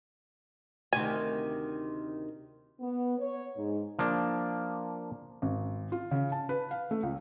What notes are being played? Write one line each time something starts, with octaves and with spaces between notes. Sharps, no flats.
D2 C3 D#3 G#5
B3
C#5
G#2
F3 A#3 D4
G#1
F4
C#3
A5
B4
F5
A3
C#2